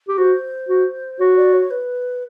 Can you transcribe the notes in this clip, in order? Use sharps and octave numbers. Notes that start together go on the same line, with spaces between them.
G4
F#4 C5
F#4
F#4 C#5
D5
C#5
B4